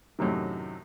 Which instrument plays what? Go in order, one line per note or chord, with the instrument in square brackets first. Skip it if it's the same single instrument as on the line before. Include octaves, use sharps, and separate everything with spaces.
[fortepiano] F#2 A2 C3 D#3